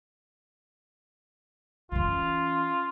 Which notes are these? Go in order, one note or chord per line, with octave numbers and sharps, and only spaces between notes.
E3 C#4 F4